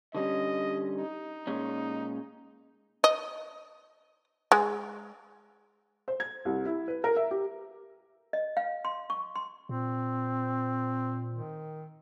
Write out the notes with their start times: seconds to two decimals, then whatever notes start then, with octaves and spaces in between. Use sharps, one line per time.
0.14 D3 G3 C#4 D#5
0.96 D#4
1.47 A#2 G#3 C#4
3.04 D#5
4.52 G#3
6.08 C5
6.20 G#6
6.45 C2
6.65 E4
6.88 B4
7.04 A#4
7.16 E5
7.31 G4
8.33 D#5
8.57 F5
8.85 C6
9.10 C#6
9.35 C6
9.69 A#2 C4
11.31 D#3